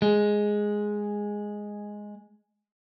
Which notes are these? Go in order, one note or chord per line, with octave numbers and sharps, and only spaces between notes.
G#3